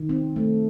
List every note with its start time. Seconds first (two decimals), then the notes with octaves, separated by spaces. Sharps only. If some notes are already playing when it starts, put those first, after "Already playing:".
Already playing: D#3
0.09 C4
0.36 A3